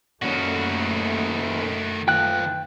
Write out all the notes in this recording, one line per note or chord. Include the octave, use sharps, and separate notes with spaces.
F#2 A#2 D#3 A3 C#4 F#4
D#3 F4 G5 F#6